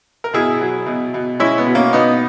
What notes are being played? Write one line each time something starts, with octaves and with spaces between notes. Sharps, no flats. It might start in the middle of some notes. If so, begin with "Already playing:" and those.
A#4
B2 E4 G#4
F#3
B2
B2
G#3 C#4 E4
B3
B2
A#3 C#4
B2 B3 D#4